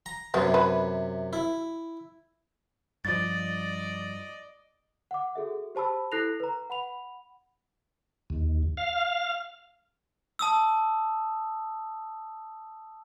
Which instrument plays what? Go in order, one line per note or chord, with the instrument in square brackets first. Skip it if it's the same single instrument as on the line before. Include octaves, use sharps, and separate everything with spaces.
[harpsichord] A#5
[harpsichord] F#2 C3 [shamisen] B3
[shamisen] B4
[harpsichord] E4
[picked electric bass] G2 F3 [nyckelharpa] D5 D#5 [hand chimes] A6
[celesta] F#5 D6
F#4 G#4 A4 E5
G4 C5 A5 B5 E6
E4 A4 F#6 A#6 C7 F7
B4 A#5
F#5 B5 F7
[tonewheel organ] D#2
F5
[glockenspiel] A5 D#6 E6